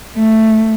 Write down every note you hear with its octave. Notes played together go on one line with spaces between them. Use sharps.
A3